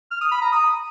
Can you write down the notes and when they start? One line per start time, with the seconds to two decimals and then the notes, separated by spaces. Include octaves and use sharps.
0.11 F6
0.21 D#6
0.32 B5
0.42 A#5
0.52 D#6